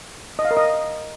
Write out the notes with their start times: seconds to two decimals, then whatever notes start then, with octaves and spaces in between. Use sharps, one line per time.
0.39 D#5
0.45 F5
0.51 A#4
0.57 D#5